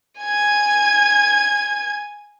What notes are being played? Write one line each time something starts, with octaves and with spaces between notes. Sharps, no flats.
G#5 G#6